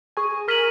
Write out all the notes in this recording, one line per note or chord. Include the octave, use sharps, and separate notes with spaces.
G#4 G#5 C#6
A#4 A#5 F6 B6 D#7 F#7